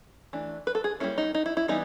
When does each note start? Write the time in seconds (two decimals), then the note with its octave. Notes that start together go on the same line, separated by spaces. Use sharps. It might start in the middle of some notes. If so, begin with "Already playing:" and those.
0.33 E3 A3 D4
0.67 B4
0.75 A4
0.84 G#4
1.00 G3 A#3 C#4 E4
1.18 D#4
1.35 D#4
1.46 E4
1.57 E4
1.68 E3 G3 B3 D#4